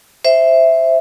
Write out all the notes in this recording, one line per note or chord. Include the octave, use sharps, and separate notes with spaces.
C5 E5